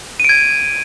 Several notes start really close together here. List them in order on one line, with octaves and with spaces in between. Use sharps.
D#7 D7 G#6